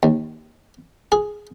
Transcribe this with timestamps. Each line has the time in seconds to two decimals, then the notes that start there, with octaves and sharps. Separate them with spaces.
0.03 D#2
1.12 G#4